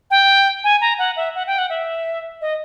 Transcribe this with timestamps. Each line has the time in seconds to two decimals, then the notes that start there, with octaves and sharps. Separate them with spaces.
0.11 G5
0.64 G#5
0.81 A#5
0.99 F#5
1.17 E5
1.35 F#5
1.47 G5
1.58 F#5
1.70 E5
2.41 D#5